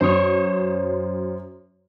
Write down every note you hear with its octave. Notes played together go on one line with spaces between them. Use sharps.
F#2 C5 C#5 C6 D#6